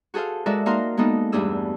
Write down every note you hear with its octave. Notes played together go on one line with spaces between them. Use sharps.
F#4 G#4 A4 C5 F5
G#3 F#4 A4 A#4 D5 E5
A#3 D#4 F#4 A#4 F5 C6
G#3 A#3 B3 D#4 A4
E2 G2 A3 D4 G#4 E6